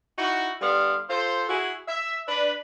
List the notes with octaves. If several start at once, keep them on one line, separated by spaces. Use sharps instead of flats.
D#4 E4 F#4
D3 G3 B3 F5 C6
F4 A4 C5
E4 F#4 G#4
E5
D4 B4